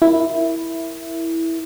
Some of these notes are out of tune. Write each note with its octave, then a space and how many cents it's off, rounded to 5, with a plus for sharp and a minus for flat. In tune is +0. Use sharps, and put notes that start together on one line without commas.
E4 +0 A#4 +0